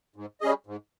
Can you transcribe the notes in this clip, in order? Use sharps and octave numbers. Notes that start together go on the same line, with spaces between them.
G#2
G3 C#4 G#4 D#5
G#2